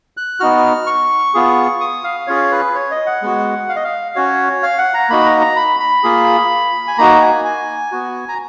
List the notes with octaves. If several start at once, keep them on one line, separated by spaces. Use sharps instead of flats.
F#6
B3 D#4 F#4 F6
C#6
B3 F4 G#4
D#6
F5
C#4 F4 G#4 C#5
B4
C#5
D#5
F#5
G#3 B3 F#4
F5
D#5
F5
C#4 F#4 C#5
F5
F#5
A#5
A#3 D#4 F#4 B5
A#5
A#5
B5
B5
A#3 F4 G#4
G#5
A#3 D#4 F#4 A#5
G#5
G#5
B3 F#4
A#5